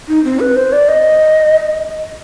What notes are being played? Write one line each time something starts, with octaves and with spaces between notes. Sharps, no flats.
D#4
C4
B4
C5
D5
D#5